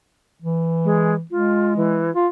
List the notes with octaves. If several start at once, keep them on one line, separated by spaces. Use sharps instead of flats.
E3
G#3
G#3 F4
E3
F4